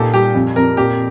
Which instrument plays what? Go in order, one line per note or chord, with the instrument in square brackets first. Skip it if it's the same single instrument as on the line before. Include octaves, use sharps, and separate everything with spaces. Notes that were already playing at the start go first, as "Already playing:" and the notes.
Already playing: [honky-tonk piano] A#2 [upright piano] D#4 F4 G4 A4
[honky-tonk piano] G3 [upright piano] G4
[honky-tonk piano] F2
[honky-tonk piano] F2 [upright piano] A#4
[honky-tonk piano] A#2 [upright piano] G4